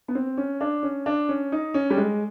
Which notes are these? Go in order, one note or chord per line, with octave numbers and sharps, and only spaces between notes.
B3
C4
C#4
D4
C#4
D4
C#4
D#4
C#4
G3
G#3